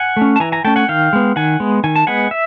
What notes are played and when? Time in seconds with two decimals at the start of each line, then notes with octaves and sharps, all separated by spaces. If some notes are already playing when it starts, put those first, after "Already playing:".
Already playing: F#5 G#5
0.17 A3 C#4
0.36 A5
0.40 E3 G#5 A#5
0.52 G#5 A#5
0.65 A3 C#4 G5 A5
0.76 F#5 G#5
0.88 D#3 F5 G5
1.13 G#3 B3
1.36 D#3 F#5 G#5
1.60 G#3 B3
1.84 D#3 G#5
1.96 A5
2.07 G#3 B3 F#5 G#5
2.31 E5